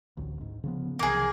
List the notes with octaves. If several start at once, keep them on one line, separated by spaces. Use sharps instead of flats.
D1 A1 D2
G#2
C#3 F3 B3
C2 C3 E3 A#3 G#4